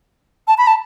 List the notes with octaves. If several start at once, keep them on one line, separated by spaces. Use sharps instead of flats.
A5
B5
A5